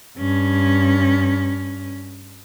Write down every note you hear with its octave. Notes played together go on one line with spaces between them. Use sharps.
G2 C#4